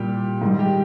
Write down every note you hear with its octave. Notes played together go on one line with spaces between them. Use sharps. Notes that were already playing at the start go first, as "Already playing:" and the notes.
Already playing: A#2 G3 G4
G#2 D#3 G3
G4